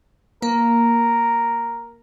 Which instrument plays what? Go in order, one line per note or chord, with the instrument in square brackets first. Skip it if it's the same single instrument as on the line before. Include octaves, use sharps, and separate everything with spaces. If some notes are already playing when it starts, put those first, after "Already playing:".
[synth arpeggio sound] A#3 [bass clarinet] A#4